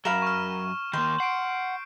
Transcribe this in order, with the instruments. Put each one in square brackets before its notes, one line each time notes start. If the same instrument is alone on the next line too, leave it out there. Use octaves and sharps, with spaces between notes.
[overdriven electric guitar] F#2 F#3 [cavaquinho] A#4 F5 B5 [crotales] E7
[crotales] C#6 F6
[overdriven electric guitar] D#3 A#3 [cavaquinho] C6 [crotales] G6
[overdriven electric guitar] F#5 [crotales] C7 D7